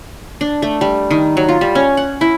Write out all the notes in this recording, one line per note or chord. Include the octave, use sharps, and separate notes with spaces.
D4
A3
G3
D#3
F#3
F4
G3
C#4
F#5
E4